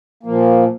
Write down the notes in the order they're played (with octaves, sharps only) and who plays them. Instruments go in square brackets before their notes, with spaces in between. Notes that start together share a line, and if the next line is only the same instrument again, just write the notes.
[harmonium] A#2 F3 A#3